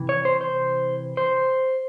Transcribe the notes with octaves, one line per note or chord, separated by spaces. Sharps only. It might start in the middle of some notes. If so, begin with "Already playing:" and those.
Already playing: C3 E3
C#5
C5
C5
C5